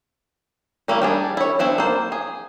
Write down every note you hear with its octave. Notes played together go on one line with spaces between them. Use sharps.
G3 A3 A#3 E4
G3 D4 G#4
E4 C#5
B3 C4 D4 E4
A#3 C5
G#4